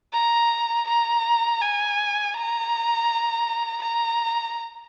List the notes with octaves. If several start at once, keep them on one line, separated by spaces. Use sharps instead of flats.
A#5
A#5
G#5
A#5
A#5